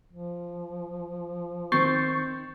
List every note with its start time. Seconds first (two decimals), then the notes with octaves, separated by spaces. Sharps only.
0.13 F3
1.72 D#3 C4 C#6 G6 A6 C7